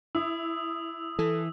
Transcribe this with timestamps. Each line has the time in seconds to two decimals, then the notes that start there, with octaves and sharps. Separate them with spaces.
0.15 E4 D#6 E6
1.19 E3 A4